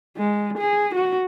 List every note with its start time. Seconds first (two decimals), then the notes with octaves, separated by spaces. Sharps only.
0.17 G#3
0.58 G#4
0.95 F#4